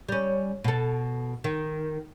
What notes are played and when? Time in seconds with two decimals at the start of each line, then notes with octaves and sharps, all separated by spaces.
0.09 G3 C#4
0.64 B2 A4
1.44 D#3